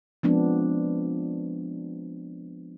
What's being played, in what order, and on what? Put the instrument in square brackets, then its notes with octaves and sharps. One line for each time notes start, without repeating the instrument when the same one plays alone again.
[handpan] F3 G#3 B3 C4 D4